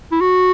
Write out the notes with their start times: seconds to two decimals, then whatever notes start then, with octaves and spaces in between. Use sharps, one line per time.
0.12 E4
0.21 F#4